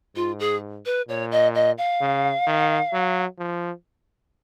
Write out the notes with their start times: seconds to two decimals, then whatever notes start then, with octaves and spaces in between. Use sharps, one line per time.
0.16 G#2 F4
0.39 G#4
0.85 B4
1.08 A#2 C#5
1.31 D#5
1.55 D#5
1.78 F5
2.01 C#3
2.47 D#3
2.94 F#3
3.39 F3